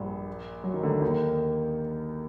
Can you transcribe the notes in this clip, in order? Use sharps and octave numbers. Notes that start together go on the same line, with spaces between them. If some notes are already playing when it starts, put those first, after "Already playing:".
Already playing: A#1 G2 A#2
F#3
D#3
D2 D3
D#2 D#3